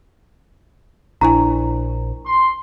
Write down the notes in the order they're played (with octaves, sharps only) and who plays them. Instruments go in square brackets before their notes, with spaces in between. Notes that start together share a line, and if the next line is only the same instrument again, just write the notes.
[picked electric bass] A#1 [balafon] D4 E4 G#5 [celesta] A#5
[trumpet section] C6